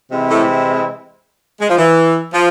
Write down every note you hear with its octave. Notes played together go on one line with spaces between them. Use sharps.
C3 E3 G#3 C4 E4
A2 A3
G#3
F3
E3
F3